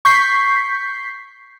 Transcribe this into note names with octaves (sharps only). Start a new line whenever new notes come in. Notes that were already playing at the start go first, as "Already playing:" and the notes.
C#6 G6 B6 C7